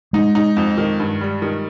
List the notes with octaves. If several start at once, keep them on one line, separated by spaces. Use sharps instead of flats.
G#3 D#4
D#4
F2
D#3
G2
G3
D#3